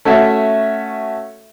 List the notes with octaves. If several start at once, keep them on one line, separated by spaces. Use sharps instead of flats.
A3 C#4 F#4 E5